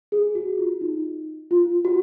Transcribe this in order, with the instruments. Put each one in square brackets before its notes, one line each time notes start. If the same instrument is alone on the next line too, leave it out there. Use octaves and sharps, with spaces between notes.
[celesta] G#4
F#4
F4
D#4
F4
F#4